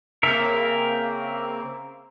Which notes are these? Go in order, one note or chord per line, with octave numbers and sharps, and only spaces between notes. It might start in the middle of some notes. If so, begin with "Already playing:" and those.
C#3 A#3 C4 A#4 E5